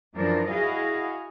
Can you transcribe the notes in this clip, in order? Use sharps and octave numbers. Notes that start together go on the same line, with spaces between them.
F#2 E3 F3 D4 A#4
E4 F#4 G#4 D#5 F5